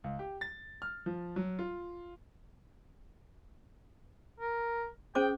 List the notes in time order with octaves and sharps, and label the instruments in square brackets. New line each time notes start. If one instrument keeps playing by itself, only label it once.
[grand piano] C#2
G4
A6
F6
F3
F#3
F4
[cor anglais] A#4
[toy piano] C#4 C5 D6 [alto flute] G#4 [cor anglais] G5